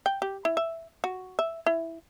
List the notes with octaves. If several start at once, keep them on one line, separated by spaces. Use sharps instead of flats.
G5
G4
E4
E5
F#4
E5
E4